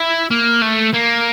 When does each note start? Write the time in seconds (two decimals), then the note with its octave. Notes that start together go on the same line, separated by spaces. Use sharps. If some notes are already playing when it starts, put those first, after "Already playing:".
Already playing: E4
0.31 A#3
0.62 A3
0.94 A#3